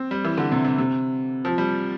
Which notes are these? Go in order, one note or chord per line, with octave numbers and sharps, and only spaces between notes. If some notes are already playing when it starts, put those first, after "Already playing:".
Already playing: C4
G3
E3
D3
C3
C3
C3
F3
G3